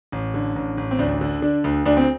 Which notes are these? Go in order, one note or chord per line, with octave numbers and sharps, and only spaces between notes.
A1
D3
A1
A1
C4
D2 D4
D3
D3 D4
D2
D2 D4
C4